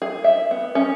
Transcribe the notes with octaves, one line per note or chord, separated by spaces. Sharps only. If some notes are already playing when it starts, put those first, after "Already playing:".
G#4
E5
B3
C#4